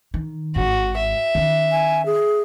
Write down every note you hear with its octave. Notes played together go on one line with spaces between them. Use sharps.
D#3
G#1 G#2 F#4
E5
D#3 C#4
G#5
G#4